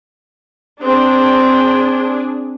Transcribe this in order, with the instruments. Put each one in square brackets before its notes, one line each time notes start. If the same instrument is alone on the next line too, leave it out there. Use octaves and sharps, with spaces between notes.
[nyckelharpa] C4 [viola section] D4 G#4